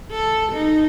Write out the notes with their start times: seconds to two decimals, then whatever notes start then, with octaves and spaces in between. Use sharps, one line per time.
0.11 A4
0.52 D#4